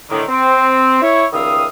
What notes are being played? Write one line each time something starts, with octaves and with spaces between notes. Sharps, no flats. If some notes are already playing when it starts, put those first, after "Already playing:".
A2 D3 D#3
C4
E4 C#5
C#2 D#3 G3 E5 F5 D#6